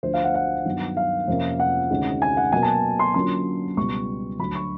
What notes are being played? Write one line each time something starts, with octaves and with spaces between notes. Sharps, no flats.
D2 D3 F3 C5
F5
F#5
F#5
G2 D#3 F#3 B3
F5
F2 C3 F3 A#3 C#4
F#5
D2 C3 D#3 G#3 C#4
G#5
F#5
B2 F#3 A#3 G#5
A5
C6
D3 F#3 A#3 C#4 F4 C6
C#2 B2 G3 B3 C#6
D2 D3 F#3 B5
C#6